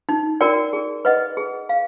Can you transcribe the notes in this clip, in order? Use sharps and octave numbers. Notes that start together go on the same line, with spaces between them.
D#4
F#4 A#4 D5 G5
G#4
B4 D#5 F#5
G#4
F5